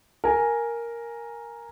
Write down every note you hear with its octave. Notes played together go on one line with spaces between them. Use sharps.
A#4 G#5